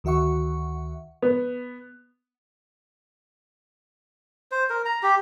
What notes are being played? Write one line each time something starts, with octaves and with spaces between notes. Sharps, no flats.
D2 D#3 F#4 E5 F#5 C#6
B3
C5
A#4
A#5
G4